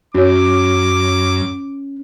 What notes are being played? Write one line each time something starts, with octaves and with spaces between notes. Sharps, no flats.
F#2 C#4 F#4 C#5 D6